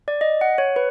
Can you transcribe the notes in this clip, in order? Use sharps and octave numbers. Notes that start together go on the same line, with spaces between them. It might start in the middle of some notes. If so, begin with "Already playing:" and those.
D5
D#5
F#5
C#5
B4